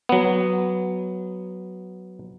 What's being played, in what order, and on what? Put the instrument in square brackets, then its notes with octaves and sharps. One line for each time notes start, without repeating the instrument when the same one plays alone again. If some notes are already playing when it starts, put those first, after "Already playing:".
[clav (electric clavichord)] F#3 B3